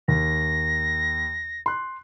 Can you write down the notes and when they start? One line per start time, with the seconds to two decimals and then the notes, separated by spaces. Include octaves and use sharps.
0.08 D#2 A#6
1.66 C6 F#6